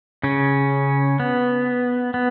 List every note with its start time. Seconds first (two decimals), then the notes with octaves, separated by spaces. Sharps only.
0.23 C#3 C#4
1.20 B3
2.14 B3